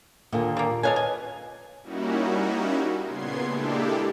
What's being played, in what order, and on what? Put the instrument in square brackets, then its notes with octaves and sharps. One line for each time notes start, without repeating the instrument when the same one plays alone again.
[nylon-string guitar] D#2 A#2 D3
[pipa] G3 A#3
[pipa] A4 F5 G#5 [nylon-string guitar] B4 C#5 D#5
[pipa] G#5
[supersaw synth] G3 A#3 C#4 D#4 E4 F#4
A#2 C#3 B3 C6 G#6 C7
G#3 A#3 D4 E4 G4 A4